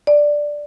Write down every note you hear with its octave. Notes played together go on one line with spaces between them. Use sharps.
D5